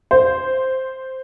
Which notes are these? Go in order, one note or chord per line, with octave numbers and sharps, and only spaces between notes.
C5